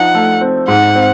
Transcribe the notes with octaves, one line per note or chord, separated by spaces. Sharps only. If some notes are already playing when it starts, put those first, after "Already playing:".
Already playing: F3 D4 D#4 F#5
A3
C4
G#2 F#5
C4